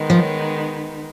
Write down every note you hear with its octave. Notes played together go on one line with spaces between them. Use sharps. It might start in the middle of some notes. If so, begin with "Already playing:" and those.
Already playing: D#3 G#3 B3 D#4
F3